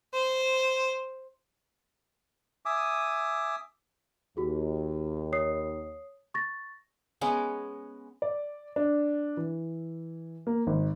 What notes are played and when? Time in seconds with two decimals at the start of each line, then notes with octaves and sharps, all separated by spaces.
0.13 C5
2.66 E5 G#5 D6 D#6
4.37 D#2 F#4 G#4
5.33 C#5 D#6 C7
6.34 C#6 A6 A#6
7.21 G#3 B3 C#4
8.22 D5
8.76 D4
9.37 E3
10.47 A#3
10.67 G#1